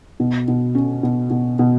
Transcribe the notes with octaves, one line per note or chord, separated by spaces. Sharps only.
B2
B2
C#4
B2
B2
B2